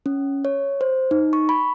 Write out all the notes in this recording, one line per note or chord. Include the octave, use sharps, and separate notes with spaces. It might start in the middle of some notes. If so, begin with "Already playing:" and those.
C#4
C#5
C5
D#4
C#6
B5